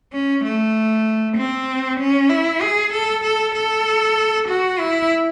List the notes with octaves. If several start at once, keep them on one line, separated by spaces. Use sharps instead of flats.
C#4
A3
C4
C#4
E4
G#4
A4
A4
A4
F#4
E4